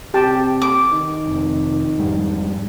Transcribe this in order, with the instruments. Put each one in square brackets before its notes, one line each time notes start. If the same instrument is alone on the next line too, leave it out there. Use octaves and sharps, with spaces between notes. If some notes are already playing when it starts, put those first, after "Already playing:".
[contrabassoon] C3 [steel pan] G4 G5 A5
[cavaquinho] D6
[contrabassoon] D#3
[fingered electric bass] F1 C3
F2 G#2 G3